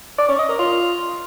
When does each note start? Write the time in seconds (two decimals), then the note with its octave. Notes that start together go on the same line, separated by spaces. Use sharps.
0.19 D5
0.29 C#4
0.39 D#5
0.49 A#4
0.59 F4